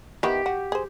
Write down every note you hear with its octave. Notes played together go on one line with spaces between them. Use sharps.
D#3 B3 E4 G4
F#4
G#4 C5